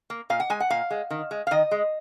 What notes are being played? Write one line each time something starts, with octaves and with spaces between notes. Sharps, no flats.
A#3
A#2 F5
F#5
G#3 G#5
F#5
A#2 F5
G#3
D#3
G#3
F5
D#3 D#5
G#3